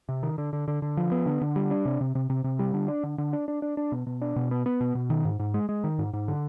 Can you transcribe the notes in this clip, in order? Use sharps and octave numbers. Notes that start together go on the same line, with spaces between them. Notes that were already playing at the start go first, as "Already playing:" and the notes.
C3
D#3
D3
D3
D3
D3
F3
B3
D3
D3
G3
D4
C3
C3
C3
C3
C3
G3
D3
D4
D3
D3
D4
D4
D4
D4
B2
B2
D4
B2
B3
B3
B2
B2
D#3
G#2
G#2
G#3
G#3
D#3
G#2
G#2
D3